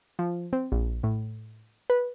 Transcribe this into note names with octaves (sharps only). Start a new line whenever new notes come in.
F3
C4
A#1
A2
B4